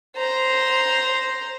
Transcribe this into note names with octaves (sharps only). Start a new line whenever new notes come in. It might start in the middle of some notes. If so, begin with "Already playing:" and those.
C5 A#5